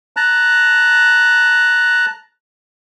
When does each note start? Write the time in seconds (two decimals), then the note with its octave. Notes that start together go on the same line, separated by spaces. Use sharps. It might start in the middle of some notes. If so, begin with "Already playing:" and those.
0.17 A5 A#5 F#6